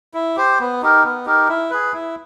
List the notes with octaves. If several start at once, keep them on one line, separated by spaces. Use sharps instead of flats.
E4
G4 C5
B3
D#4 G4 A#4
B3
D#4 G4 A#4
E4
G#4 B4
E4